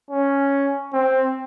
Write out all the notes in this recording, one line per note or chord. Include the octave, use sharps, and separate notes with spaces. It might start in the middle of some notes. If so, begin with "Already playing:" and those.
C#4
C4